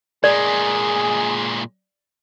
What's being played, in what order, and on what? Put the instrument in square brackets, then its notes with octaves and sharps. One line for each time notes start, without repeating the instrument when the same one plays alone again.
[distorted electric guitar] A#2 G#3 [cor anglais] G#4 [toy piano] D5